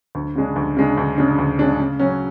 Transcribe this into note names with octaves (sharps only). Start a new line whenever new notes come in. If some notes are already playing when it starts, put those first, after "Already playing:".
D2
C#3 G#3 D4
D2
C#3 G#3 D4
D2
C#3 G#3 D4
D2
C#3 G#3 D4
C#3
F#3 C#4